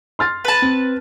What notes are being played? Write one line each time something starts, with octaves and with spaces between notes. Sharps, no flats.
C6 F6 A6
B4 A5
C4